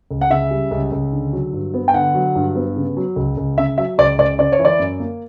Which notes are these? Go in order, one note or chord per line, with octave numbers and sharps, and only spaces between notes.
C#2
F#5
C#3 E5
G3
C#2
C#2
D3
F#3
G2
B3
G5
D3 F#5
F#3
G2
B3
C#3
F#3
C#2
C#2
C#3 E5
F#3 E5
C#2 D5
C#2 D5
C#3 D5
C#5
E3
D5
F#2
A#3